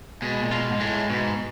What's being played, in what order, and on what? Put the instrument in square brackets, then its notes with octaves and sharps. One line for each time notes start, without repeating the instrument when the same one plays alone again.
[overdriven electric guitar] B2 [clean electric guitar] G#3
[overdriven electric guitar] A#2
[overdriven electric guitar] B2 [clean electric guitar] F4
[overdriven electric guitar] G#2
[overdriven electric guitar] A2 [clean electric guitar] G#3
[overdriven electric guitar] G#2 [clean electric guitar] B2